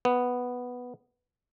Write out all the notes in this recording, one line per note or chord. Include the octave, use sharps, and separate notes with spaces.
B3